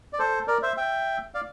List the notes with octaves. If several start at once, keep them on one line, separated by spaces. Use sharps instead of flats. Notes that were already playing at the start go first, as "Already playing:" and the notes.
D5
A4 C5
A#4 D5
C5 E5
E5 G5
D5 F5